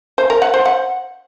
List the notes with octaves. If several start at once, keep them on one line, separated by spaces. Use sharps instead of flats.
C5
A#4
F#5
C5
F#5